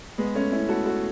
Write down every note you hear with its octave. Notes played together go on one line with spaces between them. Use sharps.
G#3 B3
A3 C#4
C#4 E4
F#4 A4
F#4 A4